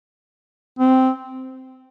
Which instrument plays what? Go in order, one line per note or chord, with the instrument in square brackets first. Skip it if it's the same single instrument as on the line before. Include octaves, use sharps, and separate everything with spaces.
[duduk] C4